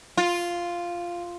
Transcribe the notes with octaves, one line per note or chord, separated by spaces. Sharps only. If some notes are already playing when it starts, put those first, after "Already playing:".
F4